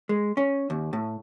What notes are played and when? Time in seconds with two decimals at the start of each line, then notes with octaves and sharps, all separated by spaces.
0.09 G#3
0.37 C#4
0.70 D#2
0.93 A2